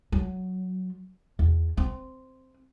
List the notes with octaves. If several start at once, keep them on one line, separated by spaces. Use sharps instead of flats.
F#3
E2
C4